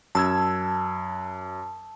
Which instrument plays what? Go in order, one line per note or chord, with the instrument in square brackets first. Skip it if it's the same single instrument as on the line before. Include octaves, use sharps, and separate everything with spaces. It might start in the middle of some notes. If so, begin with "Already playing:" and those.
[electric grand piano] F#2 E6 G#6 [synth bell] A5